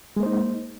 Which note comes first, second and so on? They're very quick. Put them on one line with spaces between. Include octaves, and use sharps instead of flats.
G#3 A#3 C5 D#4